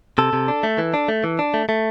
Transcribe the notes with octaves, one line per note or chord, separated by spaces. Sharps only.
C3 A4
C3
D4
A3
E3
D4
A3
E3
D4
A3
A3